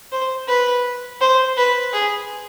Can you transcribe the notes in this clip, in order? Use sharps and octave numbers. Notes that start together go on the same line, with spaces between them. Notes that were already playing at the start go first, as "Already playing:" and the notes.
C5
B4
C5
B4
G#4